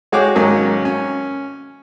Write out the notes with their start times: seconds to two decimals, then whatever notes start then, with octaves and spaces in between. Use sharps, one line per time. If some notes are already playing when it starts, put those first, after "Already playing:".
0.12 G#3 F#4 G#4 C#5 G5 D6
0.35 G#2 D#3 F#3 A#3 C#4
0.85 C#4